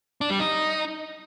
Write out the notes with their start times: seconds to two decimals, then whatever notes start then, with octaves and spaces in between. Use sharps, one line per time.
0.21 D4
0.30 G3
0.40 D#4